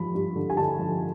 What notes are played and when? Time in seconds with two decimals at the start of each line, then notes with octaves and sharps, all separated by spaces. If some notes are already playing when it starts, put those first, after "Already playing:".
Already playing: G2 F3 B5
0.15 G2
0.36 D3
0.50 G#5
0.57 D3 A5
0.79 F3